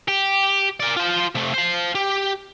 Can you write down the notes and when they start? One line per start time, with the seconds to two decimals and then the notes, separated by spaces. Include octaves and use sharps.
0.08 G4
0.80 A#4 D5
0.96 F4 C5
1.35 C3 A3
1.54 C5 F5
1.95 G4